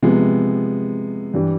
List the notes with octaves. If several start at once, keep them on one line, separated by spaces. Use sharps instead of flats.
C3 F3 G#3 B3
G2 E3 G3